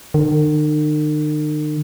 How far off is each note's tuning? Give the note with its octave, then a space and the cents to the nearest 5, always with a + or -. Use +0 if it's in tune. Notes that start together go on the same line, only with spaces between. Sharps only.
D#3 -45